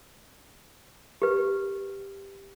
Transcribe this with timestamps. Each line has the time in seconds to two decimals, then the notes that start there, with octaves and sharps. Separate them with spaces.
1.22 G4 B4